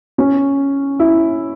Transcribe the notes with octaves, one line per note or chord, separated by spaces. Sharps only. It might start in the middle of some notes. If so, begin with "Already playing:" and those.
C#4
E4